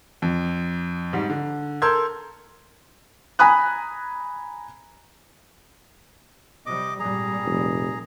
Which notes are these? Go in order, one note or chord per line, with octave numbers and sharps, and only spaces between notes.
F2
G#2 G3
D3
A4 A#4 C6 E6 G6 G#6
G#5 A#5 B5 D#6 F#6
C3 G3 D#5 D6
G#1 A#2 G3 G#4 A#5
F1